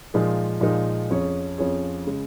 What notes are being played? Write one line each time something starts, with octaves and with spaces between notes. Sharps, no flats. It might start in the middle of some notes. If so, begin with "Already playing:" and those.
A#2 F3 G#3 D#4 G#4
A#2 F3 G#3 D#4 G#4
F2 F3 C#4 G#4 C#5
F2 F3 C#4 G#4 C#5
C#3 G#3